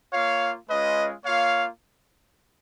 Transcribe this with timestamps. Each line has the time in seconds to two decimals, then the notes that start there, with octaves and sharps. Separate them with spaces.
0.13 A#3 F4 C#5 F5
0.69 G#3 C#4 F4 B4 D#5
1.25 A#3 F4 C#5 F5